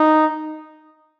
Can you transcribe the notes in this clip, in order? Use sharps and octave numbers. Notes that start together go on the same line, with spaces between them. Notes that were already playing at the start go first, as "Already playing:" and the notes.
Already playing: D#4